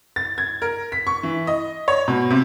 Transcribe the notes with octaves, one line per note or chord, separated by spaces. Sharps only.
A6
G#6
A#4
B6
C#6
E3
D#5
C#5
B2
C3